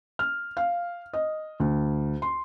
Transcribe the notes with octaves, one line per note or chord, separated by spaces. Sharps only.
F6
F5
D#5
D2
C6